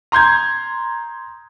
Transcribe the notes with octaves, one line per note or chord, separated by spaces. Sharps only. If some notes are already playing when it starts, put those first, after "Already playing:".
A#5 C6 G6 G#6